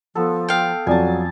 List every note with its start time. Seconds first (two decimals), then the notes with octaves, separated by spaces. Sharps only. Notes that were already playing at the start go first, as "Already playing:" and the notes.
0.15 F3 B3 A4
0.49 F5 G5
0.87 F2 F#3 D5 G#5 A5